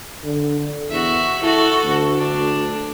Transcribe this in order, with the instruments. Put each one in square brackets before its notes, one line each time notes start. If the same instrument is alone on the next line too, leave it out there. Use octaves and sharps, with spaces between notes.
[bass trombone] D3
[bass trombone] E2 [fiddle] F#4 E5
[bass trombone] E4 [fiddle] F#4 A4
[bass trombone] D2
[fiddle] D4